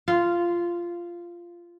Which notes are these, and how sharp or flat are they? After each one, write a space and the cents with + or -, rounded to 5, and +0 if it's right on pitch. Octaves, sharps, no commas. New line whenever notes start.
F4 -10